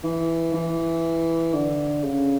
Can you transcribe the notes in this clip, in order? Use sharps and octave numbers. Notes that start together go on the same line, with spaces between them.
E3
E3
D3
C#3